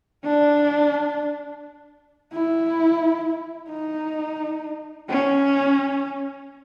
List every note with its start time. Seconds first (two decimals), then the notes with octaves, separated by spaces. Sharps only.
0.25 D4
2.33 E4
3.70 D#4
5.09 C#4